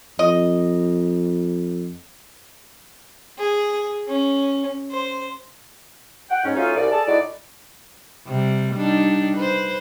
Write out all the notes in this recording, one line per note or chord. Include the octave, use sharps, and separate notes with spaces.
F2 D#5
G#4
C#4
C5
F#5 G5
G#2 C#4
F#3 A3 C#4 D#4 F4
C2 D5
G#4 A4 D5 A5
A2 D#4 F#4 D5
C3 G3
G3 D4 D#4
B4 C5